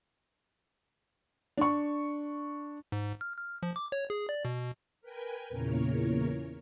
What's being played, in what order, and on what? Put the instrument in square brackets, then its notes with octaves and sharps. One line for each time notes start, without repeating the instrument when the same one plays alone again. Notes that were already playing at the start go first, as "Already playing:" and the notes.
[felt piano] D4 C#6
[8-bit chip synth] G#2
F6
F6
F3
D6
C#5
G#4
D5
B2
[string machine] A#4 B4 G5 G#5
E2 A#2 C#3 E3 A#4 C#5